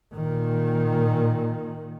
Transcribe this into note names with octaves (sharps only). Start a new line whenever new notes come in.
A#2 D#3